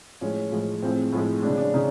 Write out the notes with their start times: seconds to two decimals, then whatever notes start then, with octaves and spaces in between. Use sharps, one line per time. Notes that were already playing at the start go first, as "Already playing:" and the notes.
0.21 A2 F3 G#3 C#4
0.52 A2 F3 G#3
0.82 A2 F3 G#3 C4
1.12 A2 F3 G#3
1.43 C#3 F3 G#3 D4
1.58 D4
1.74 C#3 D#4